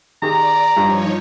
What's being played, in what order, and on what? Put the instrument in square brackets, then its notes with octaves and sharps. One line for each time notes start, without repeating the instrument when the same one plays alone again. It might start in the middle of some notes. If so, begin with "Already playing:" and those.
[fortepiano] D#3 G4 G#4 [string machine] D5 [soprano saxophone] A#5
[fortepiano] G2 G4 [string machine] F3 D#4 C#5